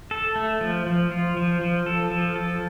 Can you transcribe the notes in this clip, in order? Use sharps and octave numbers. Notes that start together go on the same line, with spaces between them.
A4
A3
F3
F3
F4
F3
F3
A4
F3
A4